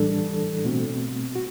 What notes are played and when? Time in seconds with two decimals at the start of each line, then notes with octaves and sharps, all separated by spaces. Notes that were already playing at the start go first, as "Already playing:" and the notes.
Already playing: A2 E3 G3 D4 A4
0.65 B2 A3 C4 F#4
1.35 F#4